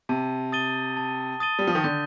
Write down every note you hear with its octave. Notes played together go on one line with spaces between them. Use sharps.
C3 A5
D#6 A6 D#7 G7
A5
D#6 A6 D#7 G7
G3
F3
D#3
D3 G6